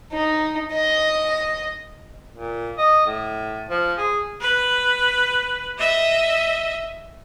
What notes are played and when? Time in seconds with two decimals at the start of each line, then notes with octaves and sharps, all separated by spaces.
0.12 D#4
0.73 D#5
2.36 A#2
2.78 D#5
3.07 A2
3.70 F3
3.98 G#4
4.41 B4
5.78 D#5 E5